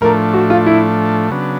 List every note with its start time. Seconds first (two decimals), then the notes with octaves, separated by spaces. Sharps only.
0.01 A2 F3 A3 D4 A#4
0.34 F#4
0.50 F4
0.66 E4
1.31 C#3 F#3 B3 D4